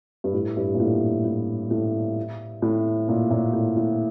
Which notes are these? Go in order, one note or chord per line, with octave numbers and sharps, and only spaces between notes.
G2
A2
G2
A#2
A2
A2
A2
A2
A#2
A#2
A2
A2